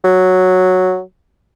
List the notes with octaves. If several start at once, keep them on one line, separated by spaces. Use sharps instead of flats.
F#3